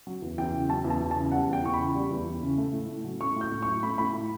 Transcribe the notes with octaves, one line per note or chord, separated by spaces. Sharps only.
F#3
E2
E2 G5
C#3
F#3 A5
E2
A5
E2
A5
C#3
G3 F#5
E2
G5
E2 C#6
C#3 B5
G3
E2
E2
C#3
A3
A2
A2
F#3
A3 C#6
A2 G6
A2
C#6
F#3
A3 B5
A2 B5
A2